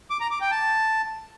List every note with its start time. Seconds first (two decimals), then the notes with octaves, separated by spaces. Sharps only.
0.10 D6
0.21 A#5
0.31 D6
0.41 G5
0.51 A5